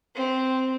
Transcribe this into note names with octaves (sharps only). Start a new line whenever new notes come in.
C4